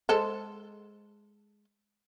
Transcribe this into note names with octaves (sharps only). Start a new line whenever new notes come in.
G#3 A4 C5